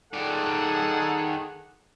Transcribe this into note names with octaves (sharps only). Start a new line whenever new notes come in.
D#3 G#4 A4 D5 F#5